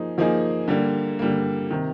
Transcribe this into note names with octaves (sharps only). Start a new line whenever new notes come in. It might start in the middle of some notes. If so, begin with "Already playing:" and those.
Already playing: F3 A#3 D#4 G#4
F3 A#3 D#4 G#4
D3 G3 A#3
D3 G3 A#3
C3 D#3